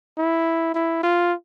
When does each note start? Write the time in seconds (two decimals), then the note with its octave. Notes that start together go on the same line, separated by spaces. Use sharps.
0.18 E4
0.75 E4
1.03 F4